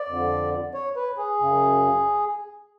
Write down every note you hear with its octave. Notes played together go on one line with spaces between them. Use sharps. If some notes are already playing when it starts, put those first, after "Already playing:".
Already playing: D5
F2 D3
C#5
B4
G#4
F#2 C#3